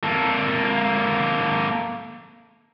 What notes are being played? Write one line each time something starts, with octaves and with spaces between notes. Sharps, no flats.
A#3 A4